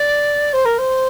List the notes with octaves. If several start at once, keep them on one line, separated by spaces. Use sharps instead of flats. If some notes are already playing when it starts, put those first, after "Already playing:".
Already playing: D5
C5
A#4
C5